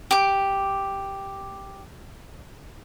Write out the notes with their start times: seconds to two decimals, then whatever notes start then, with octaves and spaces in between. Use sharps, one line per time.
0.11 G4 D6